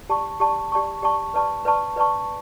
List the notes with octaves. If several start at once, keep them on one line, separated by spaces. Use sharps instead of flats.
G4 D5 A5 C#6
G4 D5 A5 C#6
G4 D5 A5 C#6
G4 D5 A5 C#6
B4 D5 A5 C#6
B4 D5 A5 C#6
B4 D5 A5 C#6